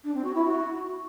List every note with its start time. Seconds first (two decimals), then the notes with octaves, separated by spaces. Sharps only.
0.04 D4
0.14 C4
0.24 F#4
0.34 E4
0.45 F#4